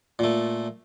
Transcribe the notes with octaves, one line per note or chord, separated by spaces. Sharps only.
A#2 A3